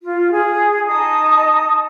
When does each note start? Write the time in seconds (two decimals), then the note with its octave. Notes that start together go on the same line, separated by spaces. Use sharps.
0.02 F4
0.31 G#4
0.86 D#4 D#5 A5 D#6